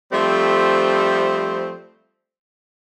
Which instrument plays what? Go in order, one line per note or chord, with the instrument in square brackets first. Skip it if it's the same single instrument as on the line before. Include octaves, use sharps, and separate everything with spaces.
[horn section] F3 G3 A3 C4